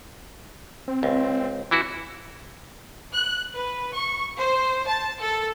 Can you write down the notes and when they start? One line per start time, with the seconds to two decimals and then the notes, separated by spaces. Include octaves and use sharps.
0.88 C4
1.03 C#2
1.71 E3 E4 F#4
3.12 F#6
3.54 B4
3.95 C#6
4.38 C5
4.87 A5
5.21 A4